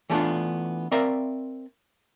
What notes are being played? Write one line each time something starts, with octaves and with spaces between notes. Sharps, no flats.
E3 G3 A3 B3 D4 F4
C4 A#4 D5 E5 F5 A#5